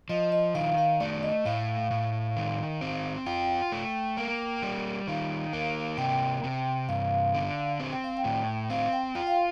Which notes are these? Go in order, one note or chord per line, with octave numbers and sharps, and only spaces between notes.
F3 D#5
D#5
D#3 F5
F5
A3 D5
D#5
A2 F5
A2
D#3
C4
F4 G5
A3
A#3
G3
D#3 F5
A#3
C3 G5
C3
G2 F5
D3
C4
G5
F5
G5
A2
C4 F5
G5
F4 G5
F5